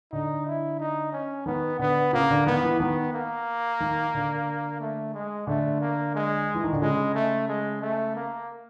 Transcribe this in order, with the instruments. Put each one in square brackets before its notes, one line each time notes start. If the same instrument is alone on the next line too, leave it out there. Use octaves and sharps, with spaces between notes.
[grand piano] D3 [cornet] D#4
[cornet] E4
D#4
C#4
[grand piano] D#3 [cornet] B3
[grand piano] D3 [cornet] B3
[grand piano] C#3 [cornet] A#3
[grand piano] D3
[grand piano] D#3 [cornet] B3
[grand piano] E3
[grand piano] D#3 [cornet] B3
[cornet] A#3
[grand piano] D#3
D3
[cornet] A3
G#3
[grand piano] D3 [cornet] A3
[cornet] A#3
G#3
[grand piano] E3
D#3
D3
[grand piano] C#3 [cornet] G#3
[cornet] A3
G#3
A3
A#3